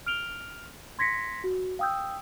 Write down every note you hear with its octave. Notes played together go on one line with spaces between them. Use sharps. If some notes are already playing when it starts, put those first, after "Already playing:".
F6 D7 F7 G7
C6 G#6 A#6 B6 C#7
F#4
F5 G5 D#6 E6 G6